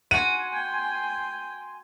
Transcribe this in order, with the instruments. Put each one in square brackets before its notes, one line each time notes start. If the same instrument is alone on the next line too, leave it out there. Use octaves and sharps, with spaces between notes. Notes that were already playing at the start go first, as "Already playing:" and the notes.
[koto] F#4 F#5 [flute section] G#5 C6 [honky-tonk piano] D#7
[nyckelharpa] G5